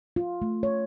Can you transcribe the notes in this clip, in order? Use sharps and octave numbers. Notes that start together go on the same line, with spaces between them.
F4
A3
C#5